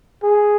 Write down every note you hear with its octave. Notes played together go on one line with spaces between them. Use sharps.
G#4